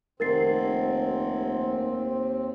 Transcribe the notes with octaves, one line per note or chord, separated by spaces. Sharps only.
F1 D#2 C4 A#4 A6 C7